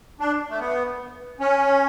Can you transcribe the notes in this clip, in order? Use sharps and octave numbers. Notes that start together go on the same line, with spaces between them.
D4
A3
B3
C#4